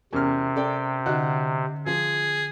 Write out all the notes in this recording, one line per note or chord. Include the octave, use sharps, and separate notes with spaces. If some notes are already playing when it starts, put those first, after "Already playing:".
E2 C3 C#4 A#4 F6
A4 D5 G5
D3 D#4 F#4 F#5 F#6
F3 G#4